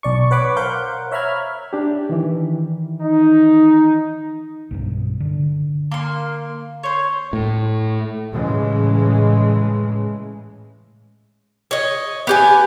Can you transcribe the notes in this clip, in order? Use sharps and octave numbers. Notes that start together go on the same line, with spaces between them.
B1 D5 C#6
B4 C#5 F#5 B5 D6
A#4 C5 F5 F#5 G6
C#5 E5 A#5 B5 F6 G#6
D4 G4
D#3 E3
D#4
B1 G2 B2
D3
A#3 C6
C5 C#5
A2
A2 C#3 E3 G#3
C#5 D#5
B3 G4 G#5